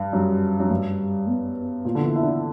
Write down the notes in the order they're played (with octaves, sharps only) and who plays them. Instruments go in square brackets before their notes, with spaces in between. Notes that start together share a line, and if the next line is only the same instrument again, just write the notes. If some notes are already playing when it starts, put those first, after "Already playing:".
Already playing: [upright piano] G2
[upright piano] F#2 [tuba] G3
[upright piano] F#2
G2
[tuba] B3
[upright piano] A#2
D3
E3
E4
D4